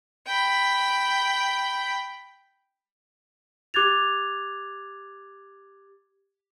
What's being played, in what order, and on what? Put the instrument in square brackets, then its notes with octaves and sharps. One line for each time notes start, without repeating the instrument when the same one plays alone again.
[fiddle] G5 B5
[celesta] G4 D6 F#6 G#6 A6 F7